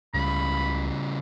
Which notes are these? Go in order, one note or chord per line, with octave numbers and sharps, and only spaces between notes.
C#2 C#3 G3 B5